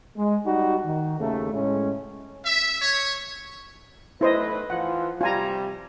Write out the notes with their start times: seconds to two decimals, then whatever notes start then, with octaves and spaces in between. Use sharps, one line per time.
0.17 G#3
0.46 G3 D#4 F#4
0.85 D#3
1.20 D#2 C#3 A3
1.54 A2 G#3 C#4
2.45 E5
2.80 C#5
4.21 B1 A3 E4 B4 C5 D#5
4.70 E3 F3 F4 F#5
5.21 C3 F3 G3 F4 G#5 A#5